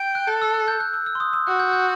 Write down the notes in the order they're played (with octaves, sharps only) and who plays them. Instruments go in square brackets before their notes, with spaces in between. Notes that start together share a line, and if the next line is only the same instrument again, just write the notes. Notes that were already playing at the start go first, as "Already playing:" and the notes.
Already playing: [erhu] G5
[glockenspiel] F#6
[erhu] A4 [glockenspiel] F#6
[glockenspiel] E6
F#6
G6
F#6
E6
E6
C6
D#6
E6
[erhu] F#4 [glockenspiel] F#6
[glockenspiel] G6
G6